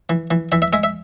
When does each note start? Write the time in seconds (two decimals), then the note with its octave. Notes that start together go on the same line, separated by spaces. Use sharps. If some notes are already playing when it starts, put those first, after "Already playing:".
0.09 E3
0.31 E3
0.52 E3 E5
0.62 E5
0.73 G#3 E5
0.83 E5